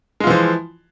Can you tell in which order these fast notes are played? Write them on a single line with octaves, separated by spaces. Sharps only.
G#3 F4 E3 F3